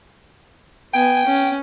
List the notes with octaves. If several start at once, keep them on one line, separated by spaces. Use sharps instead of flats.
B3 G5 G#5
C#4